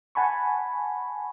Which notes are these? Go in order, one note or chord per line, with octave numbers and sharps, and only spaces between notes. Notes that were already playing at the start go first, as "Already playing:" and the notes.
F#5 G#5 A5 B5 C#6